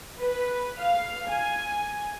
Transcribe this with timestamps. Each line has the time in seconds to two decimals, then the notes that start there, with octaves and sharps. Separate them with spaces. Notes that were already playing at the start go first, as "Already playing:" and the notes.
0.18 B4
0.79 F5
1.29 G#5